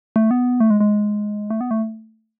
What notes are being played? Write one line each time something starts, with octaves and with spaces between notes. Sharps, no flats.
A3
B3
A3
G#3
G#3
A3
B3
A3